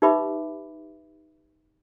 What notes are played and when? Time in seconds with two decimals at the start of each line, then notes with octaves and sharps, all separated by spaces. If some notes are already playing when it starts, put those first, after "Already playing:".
0.02 D#4 G4 B4 E5 B5 D6